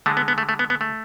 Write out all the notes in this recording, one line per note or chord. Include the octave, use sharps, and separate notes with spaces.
D3 G#3 A3
B3
B3
A3
A3
B3
B3
A3